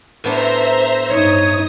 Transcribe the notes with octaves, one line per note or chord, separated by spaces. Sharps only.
A2 B3 D4 C5 E5 A#5
G2 D#4 C#5 D#6